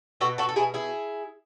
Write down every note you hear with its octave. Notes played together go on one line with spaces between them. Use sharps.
B2 F#4 A4
F#4 A4
A4
B2 E4 G#4
E4 G#4